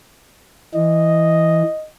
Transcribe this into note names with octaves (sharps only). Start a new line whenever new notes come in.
E3 D#5